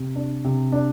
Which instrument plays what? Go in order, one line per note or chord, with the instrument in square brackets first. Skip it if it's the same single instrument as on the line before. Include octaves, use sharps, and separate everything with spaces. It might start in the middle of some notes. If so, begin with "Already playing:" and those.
Already playing: [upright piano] C3
D4
C3
D4